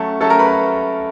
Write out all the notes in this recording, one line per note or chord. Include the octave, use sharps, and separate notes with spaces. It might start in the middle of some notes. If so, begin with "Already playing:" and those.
Already playing: F#3 A3 C#4 A5
F#3 A3 C#4 A4 A5
A#4 A#5
B4 B5